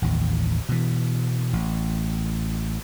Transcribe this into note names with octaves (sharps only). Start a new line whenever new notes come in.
A1 D#2
B2 E3
A1